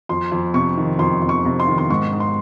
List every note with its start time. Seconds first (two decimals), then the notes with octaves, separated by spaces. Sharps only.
0.09 F2 C6
0.32 F2
0.54 C3 C#6
0.77 D#3
0.99 F2 C6
1.22 F2
1.29 C#6
1.45 C3
1.60 C6
1.67 D#3
1.78 C6
1.90 G#2 C#6
2.12 G#2
2.20 C6